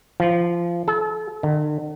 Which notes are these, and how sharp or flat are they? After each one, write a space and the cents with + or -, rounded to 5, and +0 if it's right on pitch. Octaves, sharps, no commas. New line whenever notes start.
F3 -20
A4 -35
D3 +45